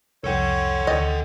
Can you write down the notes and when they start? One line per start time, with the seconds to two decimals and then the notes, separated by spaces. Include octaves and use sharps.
0.24 C2 F2 A4 C#5 F#5 G5
0.87 D2 D#5 G5 A6